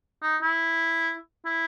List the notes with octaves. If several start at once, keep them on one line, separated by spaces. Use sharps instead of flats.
D#4
E4
E4